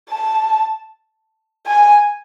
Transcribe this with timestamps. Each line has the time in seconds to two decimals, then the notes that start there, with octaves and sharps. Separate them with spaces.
0.11 A5
1.67 G#5